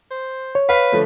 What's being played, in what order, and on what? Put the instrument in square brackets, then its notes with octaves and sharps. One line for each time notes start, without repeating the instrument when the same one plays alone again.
[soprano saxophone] C5
[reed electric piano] C#5
[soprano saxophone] B4 [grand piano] F5 B6
[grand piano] D3 F3 A3